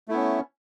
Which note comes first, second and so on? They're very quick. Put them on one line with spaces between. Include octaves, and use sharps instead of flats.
A3 E4 B3 C#4